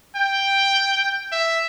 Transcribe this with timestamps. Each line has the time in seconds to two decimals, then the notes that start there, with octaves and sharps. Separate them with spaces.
0.16 G5
1.32 E5